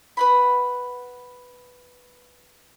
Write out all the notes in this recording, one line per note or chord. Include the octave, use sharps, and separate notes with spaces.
B4 F#5 B5